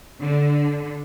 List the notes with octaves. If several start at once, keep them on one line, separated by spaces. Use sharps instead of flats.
D3